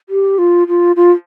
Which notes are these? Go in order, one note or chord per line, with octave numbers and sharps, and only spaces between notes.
G4
F4
F4
F4